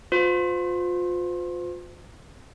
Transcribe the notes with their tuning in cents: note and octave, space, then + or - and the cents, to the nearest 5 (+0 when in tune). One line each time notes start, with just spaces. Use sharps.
F4 +30 C5 -40